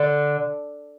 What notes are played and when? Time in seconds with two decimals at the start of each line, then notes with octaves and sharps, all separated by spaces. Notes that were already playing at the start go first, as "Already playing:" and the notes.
Already playing: D3